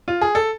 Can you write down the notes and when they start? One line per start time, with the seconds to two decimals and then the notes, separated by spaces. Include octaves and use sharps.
0.08 F4
0.21 G#4
0.35 A4